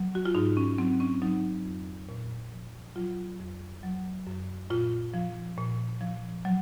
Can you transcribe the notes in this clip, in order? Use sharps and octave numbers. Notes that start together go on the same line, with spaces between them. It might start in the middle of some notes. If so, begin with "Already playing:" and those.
Already playing: F#3
F#4
F4
G#2 D#4
C#4
F#3 C4
C#4
F#3 D#4
F2
A#2
F3
F#3 F4
F2
F#3
F#2
A#2 F4
F3
A#2
F3
F#3